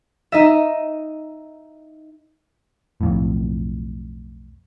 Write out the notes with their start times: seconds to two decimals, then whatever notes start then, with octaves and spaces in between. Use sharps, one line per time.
0.32 D#4 D#5 E5
3.01 B1 F2 A2